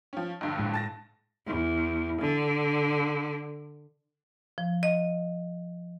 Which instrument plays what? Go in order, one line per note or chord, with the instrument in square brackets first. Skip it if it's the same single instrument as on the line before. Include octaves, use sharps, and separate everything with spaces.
[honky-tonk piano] F3 C#4
A#1 G2 D3
[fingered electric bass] A2 G#3
[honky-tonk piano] A5 A6 A#6
[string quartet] E2
D3
[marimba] F3
D#5